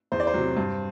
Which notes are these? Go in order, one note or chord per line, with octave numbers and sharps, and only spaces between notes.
E2 C5
D5
C5
C3 F#3
G2